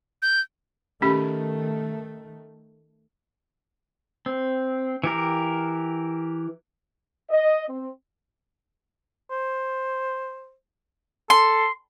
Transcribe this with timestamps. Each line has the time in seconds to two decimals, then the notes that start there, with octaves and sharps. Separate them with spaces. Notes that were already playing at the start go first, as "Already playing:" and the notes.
0.22 G6
1.02 D#3 A3 C#4 G4 B5
4.26 C4
5.04 E3 G4 A#4
7.30 D#5
7.68 C4
9.31 C5
11.30 A4 C6